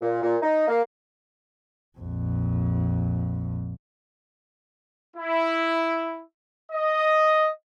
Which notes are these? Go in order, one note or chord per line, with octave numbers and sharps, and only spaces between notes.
A#2
A#2
D#4
A#3
A#1 F2
E4
D#5